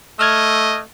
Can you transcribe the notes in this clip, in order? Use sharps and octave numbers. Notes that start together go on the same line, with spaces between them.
A3 D#5 E6 F6 G#6